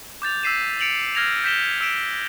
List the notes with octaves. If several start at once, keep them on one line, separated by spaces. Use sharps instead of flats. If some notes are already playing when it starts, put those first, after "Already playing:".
D6 G6 A6 F7
E6 G6 B6 C7 D#7 E7
A6 C#7 D7 F7 F#7
F6 G6 G#6 A#6 C7 F7
G6 B6 E7 G7
E6 B6 D7 E7